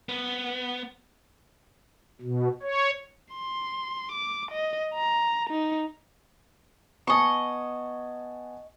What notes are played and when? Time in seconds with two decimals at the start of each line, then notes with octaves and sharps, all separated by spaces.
0.09 B3
2.21 B2
2.63 C#5
3.34 C6
4.12 D6
4.51 D#5
4.94 A#5
5.50 D#4
7.07 B3 D#5 G#5 A5 C#6